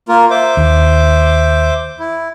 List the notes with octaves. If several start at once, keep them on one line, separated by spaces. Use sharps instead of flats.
A#3 F4 A#4
C5 E5 D6
D#2
E4